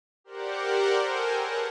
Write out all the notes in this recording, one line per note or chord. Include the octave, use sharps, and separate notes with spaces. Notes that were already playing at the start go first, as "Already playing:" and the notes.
G4 A#4 C5 D5 F#5
A4 A#4 C5 G5 G#5
G#4 A#4 B4 C#5 F#5 A5